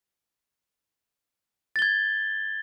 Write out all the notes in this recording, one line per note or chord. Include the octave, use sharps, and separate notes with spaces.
G#6 A6 G7